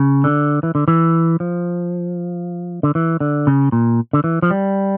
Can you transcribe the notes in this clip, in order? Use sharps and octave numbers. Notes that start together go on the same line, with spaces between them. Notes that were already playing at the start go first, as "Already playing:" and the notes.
Already playing: C#3
D3
E3
D3
E3
F3
D3
E3
D3
C#3
A#2
D3
E3
F3
G3